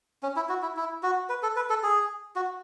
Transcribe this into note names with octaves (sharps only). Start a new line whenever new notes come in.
C#4
E4
F#4
E4
E4
F#4
B4
A4
B4
A4
G#4
F#4